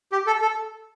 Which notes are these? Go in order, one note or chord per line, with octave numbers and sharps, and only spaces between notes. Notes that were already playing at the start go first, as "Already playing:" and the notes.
G4
A4
A4